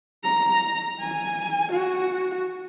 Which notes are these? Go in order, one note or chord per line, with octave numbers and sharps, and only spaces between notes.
A#5
G#5
F#4